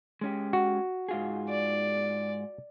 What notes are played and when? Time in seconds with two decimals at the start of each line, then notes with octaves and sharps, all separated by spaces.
0.21 G#3 C#4 G4
0.53 F#4
1.09 G#2 F4 G#4
1.49 D5